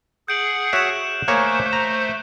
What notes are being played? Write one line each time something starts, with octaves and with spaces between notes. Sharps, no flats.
G#4 F#5 G6 D7 F#7
F#4 C#5 E5 F#6 E7
A3 A#3 G#4 C5 C#5
A#5